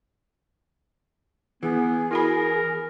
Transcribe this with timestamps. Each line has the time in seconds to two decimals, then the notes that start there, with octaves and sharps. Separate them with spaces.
1.63 E3 B3 G#4
2.11 E4 F#4 A#4 B5